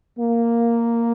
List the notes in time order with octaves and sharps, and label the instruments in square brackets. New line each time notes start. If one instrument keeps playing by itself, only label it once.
[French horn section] A#3